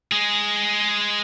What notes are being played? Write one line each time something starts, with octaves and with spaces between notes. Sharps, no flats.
G#3 G#4